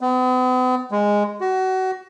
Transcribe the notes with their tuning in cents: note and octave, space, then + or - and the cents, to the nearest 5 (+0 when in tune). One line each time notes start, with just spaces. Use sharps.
B3 +45
G#3 -10
F#4 +25